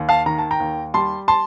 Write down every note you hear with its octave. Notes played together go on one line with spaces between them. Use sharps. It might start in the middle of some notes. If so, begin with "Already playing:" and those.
Already playing: D#2
F5 A5
D#3 A#5
A5
G5 A#5
D#2
G3 A5 C6
A5 C6